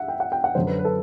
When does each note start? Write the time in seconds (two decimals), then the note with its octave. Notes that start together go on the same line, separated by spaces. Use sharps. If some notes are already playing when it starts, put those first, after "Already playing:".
Already playing: E5 F#5
0.08 G5
0.20 F#5
0.32 G5
0.44 F#5
0.55 F#2 D3 F#3 C5
0.67 B4
0.79 B4
0.85 A4